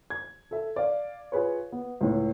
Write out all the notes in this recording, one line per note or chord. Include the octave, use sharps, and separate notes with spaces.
G#6
A4 E5
D5 F5
F4 G#4 B4 C#5
B3
C#2 A2